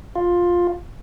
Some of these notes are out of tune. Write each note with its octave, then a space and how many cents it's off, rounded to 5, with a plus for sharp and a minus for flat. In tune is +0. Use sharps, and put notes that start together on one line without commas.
F4 +10